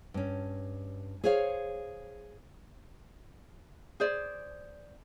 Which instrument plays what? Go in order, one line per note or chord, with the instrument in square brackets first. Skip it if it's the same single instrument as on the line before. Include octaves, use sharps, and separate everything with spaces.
[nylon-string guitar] G2 C#4
G#4 C5 C#5 F5
[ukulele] G#4 C5 D5